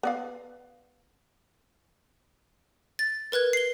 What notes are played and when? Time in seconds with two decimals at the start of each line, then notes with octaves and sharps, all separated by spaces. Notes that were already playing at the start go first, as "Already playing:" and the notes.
0.03 B3 D5 F5
2.99 A6
3.32 A#4 B4 F#6 G#6
3.53 C7 G7